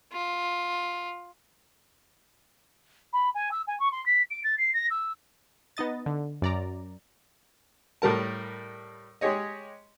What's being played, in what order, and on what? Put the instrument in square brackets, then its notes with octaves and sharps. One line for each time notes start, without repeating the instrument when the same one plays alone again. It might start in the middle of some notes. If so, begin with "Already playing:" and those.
[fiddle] F4
[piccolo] B5
G#5
E6
G#5
C#6
C6
B6
D7
A6
C7
A#6
E6
[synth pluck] B3 D#4 D#5 A6
D3
F#2 D5 A#5
[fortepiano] A2 G3 A#4 A5
G#3 G4 G#4 C#5 D#5